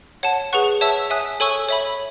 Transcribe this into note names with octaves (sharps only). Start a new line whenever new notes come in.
C#5 F#5 A5
G#4 B4 F#5 C#6 F#6
C#5 E5 A5 E6
E5 G#5 D#6 F#6
A4 C#5 G#5 C#6 E6
C#5 E5 B5